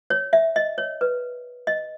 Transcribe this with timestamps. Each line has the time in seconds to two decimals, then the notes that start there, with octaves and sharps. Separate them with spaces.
0.10 C#5
0.33 E5
0.56 D#5
0.78 C#5
1.01 B4
1.67 D#5